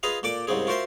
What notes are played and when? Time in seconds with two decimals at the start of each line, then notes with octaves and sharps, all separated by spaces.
0.03 F4 G#4 B4 D#5 F5
0.23 A#2 A4 D5 D6
0.47 C2 G#2 C#3 C4 G#4
0.67 F4 F#4 A#4 C5 E5 C6